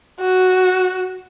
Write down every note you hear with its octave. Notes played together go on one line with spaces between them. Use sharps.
F#4